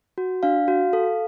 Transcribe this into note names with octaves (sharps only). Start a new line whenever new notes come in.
F#4
D4 F5
F#4
A4